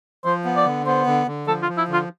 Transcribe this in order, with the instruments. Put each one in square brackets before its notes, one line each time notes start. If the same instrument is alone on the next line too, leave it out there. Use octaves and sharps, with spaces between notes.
[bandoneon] F3 [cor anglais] C5
[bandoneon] B3
[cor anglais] D5
[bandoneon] D3
[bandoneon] B3 [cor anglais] C5
[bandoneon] D3
D3
[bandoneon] F3 [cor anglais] A4
[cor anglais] F4
[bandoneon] F3
[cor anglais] E4
[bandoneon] D3
[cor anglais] F4